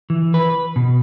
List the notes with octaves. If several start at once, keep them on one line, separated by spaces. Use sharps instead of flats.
E3
B4
B2